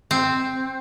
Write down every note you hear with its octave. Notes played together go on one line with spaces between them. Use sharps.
C4